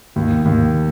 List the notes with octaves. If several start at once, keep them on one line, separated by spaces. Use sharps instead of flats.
D#2
D#2